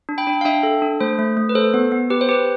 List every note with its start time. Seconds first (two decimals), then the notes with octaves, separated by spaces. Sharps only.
0.09 D4
0.18 G5 B5
0.27 D4
0.41 F5
0.45 D4 E5 G5
0.63 A4
0.82 D4
1.01 A3 C5
1.19 A3
1.37 A3
1.49 B4
1.55 A4 C5
1.74 B3
1.92 B3
2.10 G4 B4
2.21 C5
2.29 G4 B4